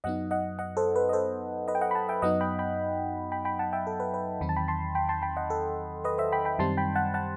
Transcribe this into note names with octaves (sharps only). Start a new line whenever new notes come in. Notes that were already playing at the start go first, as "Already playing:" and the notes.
F#2 F#3 B3 D#4 D#5 F#5
D#5 F#5
D#5 F#5
A4 C5
B4
D#5
A4 C5
B4 D#5
G5
D#5 F#5
B5
F#5 A5
E5 G5
F#2 F#3 B3 D#4 D#5 F#5
G5 B5
G5 B5
G5 B5
G5 B5
F#5 A5
E5 G5
A4
B4
B4
E2 D#3 F#3 C4 D#4 B5
A5
G5 B5
A5 C6
G5 B5
A5 C6
G5 B5
D#5 F#5
A4
B4 D#5
C5 E5
G5 B5
G5 B5
F#2 D#3 G3 C4 D#4 A5 C6
G5 B5
F#5 A5
F#5 A5